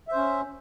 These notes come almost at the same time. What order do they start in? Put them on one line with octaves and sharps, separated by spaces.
E5 C5 C#4